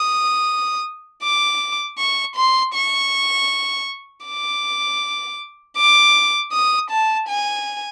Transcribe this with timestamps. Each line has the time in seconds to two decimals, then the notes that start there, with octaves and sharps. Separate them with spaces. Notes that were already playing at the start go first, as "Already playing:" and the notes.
Already playing: D#6
1.23 D6
1.98 C#6
2.36 C6
2.74 C#6
4.26 D6
5.77 D6
6.52 D#6
6.90 A5
7.28 G#5